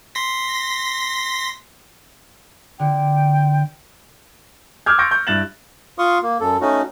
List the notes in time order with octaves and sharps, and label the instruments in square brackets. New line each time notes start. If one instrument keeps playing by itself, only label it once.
[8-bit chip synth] C6 A#6 B6
[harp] D3 [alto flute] G5
[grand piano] D6 E6 F6 G6 G#6
C6 C#6 G6 A6 A#6 D7
C#6 G6
G2 E4 F#6 A6 E7 F#7
[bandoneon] F4 F5 C6 C#6 D#6
A#3
F#2 A4
A3 C#4 D#4 F#4